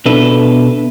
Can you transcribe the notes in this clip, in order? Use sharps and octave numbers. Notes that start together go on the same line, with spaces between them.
B2 D4 A4 B4 E5